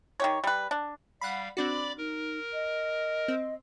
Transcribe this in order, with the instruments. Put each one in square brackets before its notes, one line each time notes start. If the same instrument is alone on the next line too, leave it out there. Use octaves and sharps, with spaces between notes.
[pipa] D#3 G4 C#5
G3 B4
D4
[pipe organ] G3 F5 [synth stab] F#5 B5
[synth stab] C4 D4 F#4 [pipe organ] D5 B5 D6
[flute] D#4 [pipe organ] A#4
[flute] D#5
[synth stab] C4